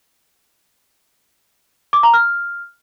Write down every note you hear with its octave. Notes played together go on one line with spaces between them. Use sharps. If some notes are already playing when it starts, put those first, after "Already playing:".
D6
A#5
F6